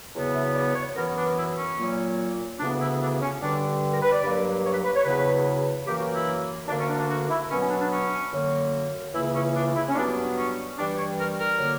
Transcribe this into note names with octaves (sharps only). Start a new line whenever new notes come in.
E2 C#3 F#3 B3
E5
D5
C#5
F#2 E3 B3 A#4
D4
E4
C#4
A#2 F#3 A#3
D2 C#3 E3 B3 D4
E4
D4
C#4
G2 D3 G3 D4
A#4
B4
D5
G2 F#3 A#3
C#5
B4
B4
C#5
E2 C#3 F#3 B3 B4
F#2 E3 A#3 G4
F#4
E4
D2 D3 A#3 D4
C#4
D4
D4
F#4
E4
B2 F#3 B3 C#4
C#4
D4
D4
C#4
F#2 D3 F#3 A#3
C#2 C#3 E3 A#3 E4
C#4
D4
E4
C#4
G2 F#3 B3 D4
C#4
G2 E3 G3 D4
C#5
A#4
A#4
D3 F#3 A#3